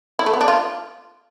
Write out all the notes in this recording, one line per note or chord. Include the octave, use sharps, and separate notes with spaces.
E4
A3
B3
D4
F4